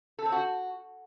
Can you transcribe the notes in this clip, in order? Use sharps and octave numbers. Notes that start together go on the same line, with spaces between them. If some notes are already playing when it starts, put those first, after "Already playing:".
A4
C4
F#4